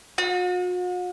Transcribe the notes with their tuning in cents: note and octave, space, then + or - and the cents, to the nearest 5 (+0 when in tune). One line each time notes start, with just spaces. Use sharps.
F#4 -45